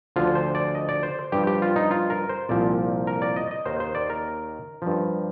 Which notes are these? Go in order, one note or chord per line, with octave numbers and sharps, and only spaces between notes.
D2 D3 F3 F4
C5
D5
D#5
D5
C5
G2 F3 G4
G4
F4
D#4
F4
A#4
C5
C2 A#2 F3 D5
A#4
D5
D#5
D#5
D#2 D#3 C5
C5
D5
A#4
G2 F3